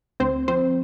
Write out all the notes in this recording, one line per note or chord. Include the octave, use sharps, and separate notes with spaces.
D2 C4 C5
F3 C4 C5